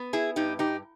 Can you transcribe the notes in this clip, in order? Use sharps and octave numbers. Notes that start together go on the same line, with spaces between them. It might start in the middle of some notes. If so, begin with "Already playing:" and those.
Already playing: B3
E4 G#4
G2 D#4 G4
D#4 G4